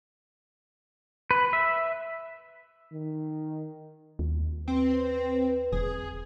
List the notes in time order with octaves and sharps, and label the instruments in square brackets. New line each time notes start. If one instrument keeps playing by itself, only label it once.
[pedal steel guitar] B4
E5
[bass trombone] D#3
[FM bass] D#2
[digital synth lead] C4 [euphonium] B4
[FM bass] E1 [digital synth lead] G#4